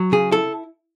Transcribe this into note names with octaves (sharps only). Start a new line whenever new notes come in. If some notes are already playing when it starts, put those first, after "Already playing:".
Already playing: F#3
C#3 G#4
E4 A4